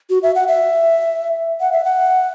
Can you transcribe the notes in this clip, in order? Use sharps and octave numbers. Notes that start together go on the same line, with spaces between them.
F#4
E5
F#5
E5
F#5
E5
F#5